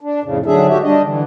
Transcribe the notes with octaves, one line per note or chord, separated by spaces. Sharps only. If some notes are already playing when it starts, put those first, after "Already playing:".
D4
F2 A2 C#3
G#2 D3 F#3 D4 G#4 E5
F#4 G4 E5
G3 D4 D#5
D3 E3